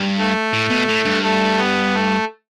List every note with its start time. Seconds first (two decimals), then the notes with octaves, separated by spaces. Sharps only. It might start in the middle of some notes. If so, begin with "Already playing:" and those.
Already playing: G2
0.19 A3
0.53 A2
0.70 B2
0.89 A2
1.06 G2
1.23 A3
1.58 B3
1.94 A3